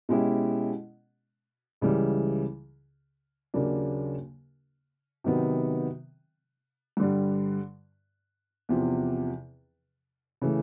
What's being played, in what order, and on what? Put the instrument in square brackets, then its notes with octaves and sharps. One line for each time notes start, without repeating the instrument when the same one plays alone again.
[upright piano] B2 G#3 C#4 E4 G4
C#2 C#3 E3 G3
D#2 C#3 F#3 A#3 D4
C3 D#3 F#3 B3
G2 D3 G3
E2 C3 F3
C#3 E3 A3